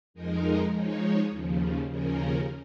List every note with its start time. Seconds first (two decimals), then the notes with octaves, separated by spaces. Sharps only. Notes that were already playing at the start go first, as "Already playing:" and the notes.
0.14 F2 F3 G#3 D#4 A#4
0.73 F3 G#3 D#4 C#5
1.30 D#2 C#3 F3
1.88 D#2 C#3 F3 C#4 A#4